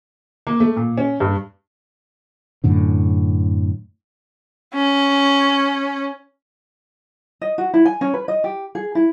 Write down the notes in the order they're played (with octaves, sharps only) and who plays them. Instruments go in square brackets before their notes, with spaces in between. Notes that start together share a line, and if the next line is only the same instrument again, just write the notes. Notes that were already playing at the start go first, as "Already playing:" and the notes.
[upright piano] A#3
A3
A#2
C#4
G2
[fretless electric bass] F#2 A2 D3
[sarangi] C#4
[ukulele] D#5
F#4
E4
G#5
C#4
B4
D#5
G4
G#4
E4